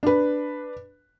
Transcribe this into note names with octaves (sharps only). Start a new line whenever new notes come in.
D4 B4